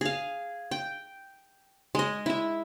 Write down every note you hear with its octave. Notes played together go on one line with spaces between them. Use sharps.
G#4 F5
G5
G#3 D#5
E4 E5